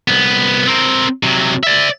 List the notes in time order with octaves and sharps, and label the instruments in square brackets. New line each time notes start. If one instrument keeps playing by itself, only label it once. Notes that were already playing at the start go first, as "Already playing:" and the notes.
[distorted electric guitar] C2 B3
C4 A#4
C3 F#3
D5 E5